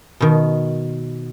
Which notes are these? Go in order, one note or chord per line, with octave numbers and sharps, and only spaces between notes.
B2 D#3